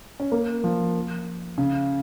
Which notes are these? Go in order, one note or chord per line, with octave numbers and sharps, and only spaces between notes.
C#4
A#3
F3
C#3